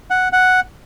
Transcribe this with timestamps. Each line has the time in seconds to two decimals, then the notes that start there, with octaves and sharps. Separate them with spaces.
0.10 F#5
0.32 F#5